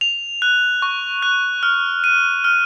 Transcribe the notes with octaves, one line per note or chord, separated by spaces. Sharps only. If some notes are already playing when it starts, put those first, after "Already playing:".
F7
F#6
C#6
F#6
F6
D#7
F6